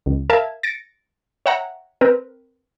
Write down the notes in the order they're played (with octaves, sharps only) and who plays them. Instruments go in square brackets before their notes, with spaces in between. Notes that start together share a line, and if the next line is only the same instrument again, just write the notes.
[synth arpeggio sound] C#2
A#4 E5 F5 A5 G#6
A6 A#6 C#7 D7
C#5 E5 F#5 G5 A#5
C4 A#4 B4